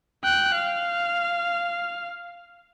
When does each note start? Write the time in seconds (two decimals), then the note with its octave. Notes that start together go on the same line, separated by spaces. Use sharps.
0.24 G5 F#6
0.55 F5